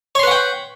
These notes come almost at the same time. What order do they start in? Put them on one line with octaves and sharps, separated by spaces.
C#5 C6 B4 F#5 G5